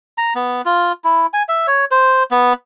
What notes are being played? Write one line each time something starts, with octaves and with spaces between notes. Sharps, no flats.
A#5
B3
F4
E4
G#5
E5
C#5
C5
B3